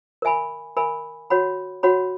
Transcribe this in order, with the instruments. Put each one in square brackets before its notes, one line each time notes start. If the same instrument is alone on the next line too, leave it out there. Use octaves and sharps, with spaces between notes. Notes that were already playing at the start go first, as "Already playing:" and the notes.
[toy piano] A#4 E5 G#5 B5
A#4 E5 G#5 B5
F#4 C#5 F#5 B5
F#4 C#5 F#5 B5